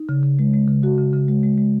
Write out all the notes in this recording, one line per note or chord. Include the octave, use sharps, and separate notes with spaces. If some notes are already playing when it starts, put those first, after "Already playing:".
Already playing: D#4
C#3
C#3
G#3
G#3
C#3
C#3 F#4
C#3
C#3
G#3
G#3
G#3